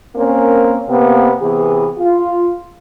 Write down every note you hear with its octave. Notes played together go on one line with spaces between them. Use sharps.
A#3 C4 C#4 A#4
C3 A#3 B3
C3 E3 B3 G#4
F4